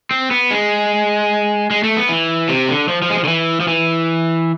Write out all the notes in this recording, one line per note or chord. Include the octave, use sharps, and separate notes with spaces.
C4
B3
G#3
G#3
A3
B3
E3
C3
D3
F3
F3
G#3
F3
D3
E3
F3
E3